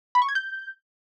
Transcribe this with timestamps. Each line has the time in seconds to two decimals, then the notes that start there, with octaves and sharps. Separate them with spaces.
0.15 B5
0.22 C#6
0.29 G#6
0.35 G6